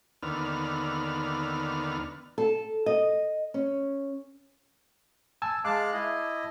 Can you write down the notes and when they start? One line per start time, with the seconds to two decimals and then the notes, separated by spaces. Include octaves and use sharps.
0.23 D#2 D3 B3 F6
2.38 A4
2.86 D#5
3.54 C#4
5.42 G#5 A5 E6
5.65 G#3 F5 A5 D6 F#6
5.94 E4 D#5